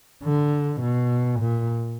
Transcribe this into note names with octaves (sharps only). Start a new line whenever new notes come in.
D3
B2
A#2